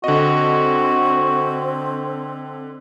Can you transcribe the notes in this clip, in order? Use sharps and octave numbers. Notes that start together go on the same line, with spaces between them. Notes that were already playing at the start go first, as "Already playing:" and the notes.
D3 C4 F#4 D#5